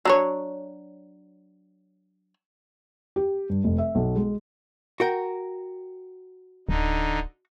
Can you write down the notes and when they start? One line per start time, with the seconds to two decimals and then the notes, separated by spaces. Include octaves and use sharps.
0.05 F#3 D4 C#5
3.16 G4
3.49 G2
3.64 F1
3.78 E5
3.95 B1
4.16 G#3
5.00 F#4 A#4 G5
6.69 D1 D3 D#4